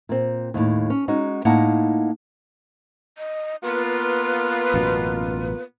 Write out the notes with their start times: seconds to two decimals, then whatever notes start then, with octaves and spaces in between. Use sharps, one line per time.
0.09 A#2 C4
0.54 D#2 A2
0.90 C#4
1.08 G#3 C#4 D#4 F#4
1.45 A2 A#3 D#4 F#5 A5
3.18 D#5
3.63 A#3 B3 F4 B4
4.74 A1 F#2 B2